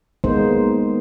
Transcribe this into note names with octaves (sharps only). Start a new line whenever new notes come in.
G#3 A#3 B3 D#4 C5